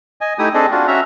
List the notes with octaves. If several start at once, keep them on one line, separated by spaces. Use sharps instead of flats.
D#5 G#5
A3 D#4 E4 G4 D#6
C4 D4 G#4 A4 D#5
D4 F4 F#4
C#4 F#4 E5 A#5